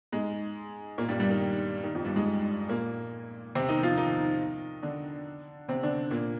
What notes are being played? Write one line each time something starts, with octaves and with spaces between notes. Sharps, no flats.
G#2 G#3
A#2 A#3
G2 G3
G2 G3
D#3
D#3
F2 F3
G2 G3
G#2 G#3
A#2 A#3
C3 C4
D#3 D#4
F3 F4
D#3 D#4
D3 D4
C3 C4
D3 D4
A#2 A#3